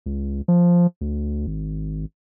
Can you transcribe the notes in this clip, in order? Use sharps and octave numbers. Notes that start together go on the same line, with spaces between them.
C#2
F3
D2
G#1